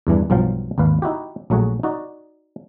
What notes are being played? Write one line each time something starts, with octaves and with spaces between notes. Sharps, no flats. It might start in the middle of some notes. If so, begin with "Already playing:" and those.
E2 G2 E3 D4
B1 G2 F3 F#3 F5 G5
G#1 D#2 B4 F5
D#4 E4 F#4 G4
A#1 F#3 A3 F#4 G#4
D#4 F#4 D5